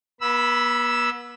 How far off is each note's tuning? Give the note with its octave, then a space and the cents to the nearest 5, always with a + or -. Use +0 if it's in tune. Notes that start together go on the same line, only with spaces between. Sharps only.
B3 -40 B5 +0 E6 +0